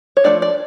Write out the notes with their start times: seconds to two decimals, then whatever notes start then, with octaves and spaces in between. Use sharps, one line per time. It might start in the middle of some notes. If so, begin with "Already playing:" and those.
0.17 C#5
0.24 F3 A3 D4 D5
0.42 D5